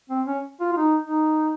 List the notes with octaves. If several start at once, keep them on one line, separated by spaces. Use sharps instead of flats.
C4
C#4
F4
F4
D#4
D#4